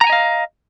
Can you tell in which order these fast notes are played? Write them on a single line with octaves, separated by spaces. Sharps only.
A#5 F#5 G#5 D#5 F5